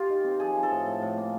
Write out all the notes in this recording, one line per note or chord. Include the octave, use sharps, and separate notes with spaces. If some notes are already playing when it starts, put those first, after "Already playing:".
Already playing: F4 G4
D#3
C4
F3 G#4
F3
A4
A2
A2
A2
A#3